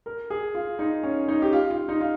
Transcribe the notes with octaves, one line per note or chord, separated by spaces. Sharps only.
A#4
G#4
F4
D#4
C#4
D#4
G4
F4
F4
D#4
F4